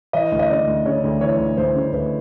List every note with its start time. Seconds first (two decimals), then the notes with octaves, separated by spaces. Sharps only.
0.13 E3 D#5
0.32 D2
0.39 D#5
0.50 C#3 D5
0.67 D2
0.85 C#3 C#5
1.04 D2
1.21 E3 C#5
1.39 D2
1.57 D2 C5
1.75 C#3
1.92 D2 B4